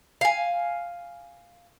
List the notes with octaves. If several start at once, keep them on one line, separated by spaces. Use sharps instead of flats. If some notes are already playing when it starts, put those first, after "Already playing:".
F5 G#5